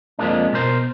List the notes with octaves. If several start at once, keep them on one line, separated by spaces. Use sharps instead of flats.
F2 F3 F#3 G#3 A#3 D4
B2 A#4 C5